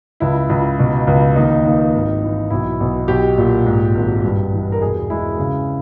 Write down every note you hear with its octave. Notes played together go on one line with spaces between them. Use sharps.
C#2 E4
C#2
B2
C#2
D#2 D#4
D#2 D#4
G#1
E3
B1 E4
B1
B1 G4
A#2
G#2
G#1
G2
E3
A#4
E1 G#4
G#3 E4
C#3